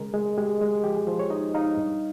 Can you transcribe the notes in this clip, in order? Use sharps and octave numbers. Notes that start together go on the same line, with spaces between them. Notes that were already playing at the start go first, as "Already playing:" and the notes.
Already playing: C#3 G#3 A#4
G#3
G#3 G4
G#3
F3 G4
G#4
F3 C5
C#5
D#4 D#5
D#4 F5
G2